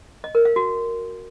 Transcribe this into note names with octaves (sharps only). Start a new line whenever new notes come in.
D#5
A#4
F5
F#4